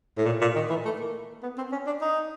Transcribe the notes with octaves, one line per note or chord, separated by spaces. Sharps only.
A2
A#2
A#2
D#3
E3
A3
A#3
B3
C4
C#4
D4
D#4